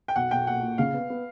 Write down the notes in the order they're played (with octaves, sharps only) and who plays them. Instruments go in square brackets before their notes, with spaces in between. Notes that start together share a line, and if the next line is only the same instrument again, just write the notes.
[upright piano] G5
[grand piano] B1 [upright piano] F#5
[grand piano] B1 [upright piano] G5
[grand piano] A#2 [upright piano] F#5
[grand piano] A#2
[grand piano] C#3 [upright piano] F5
[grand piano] B3
B3